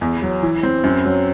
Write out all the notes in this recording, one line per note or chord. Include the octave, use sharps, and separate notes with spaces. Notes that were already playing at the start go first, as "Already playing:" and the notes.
E2
F#3
E3
C4
F#2
F#3